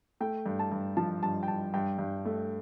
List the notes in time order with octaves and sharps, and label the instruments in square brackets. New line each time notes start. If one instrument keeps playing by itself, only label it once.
[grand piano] A3 G5
G2
A5
G2
F3 A5
G2 A5
G5
G2 A5
G2 G5
G2
A3